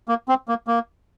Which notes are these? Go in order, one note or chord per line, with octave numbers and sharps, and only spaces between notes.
A#3
C4
A#3
A#3